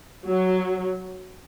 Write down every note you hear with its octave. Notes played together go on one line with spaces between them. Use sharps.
F#3